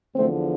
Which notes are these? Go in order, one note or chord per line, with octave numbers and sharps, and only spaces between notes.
E2 D3 F3 A3 C4